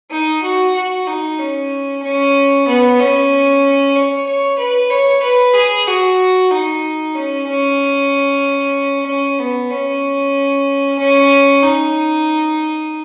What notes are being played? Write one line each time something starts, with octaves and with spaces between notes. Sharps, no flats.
D#4
F#4
F#4
D#4
C#4
C#4
B3
C#4
C#5
C#5
B4
C#5
B4
G#4
F#4
D#4
C#4
C#4
C#4
B3
C#4
C#4
D#4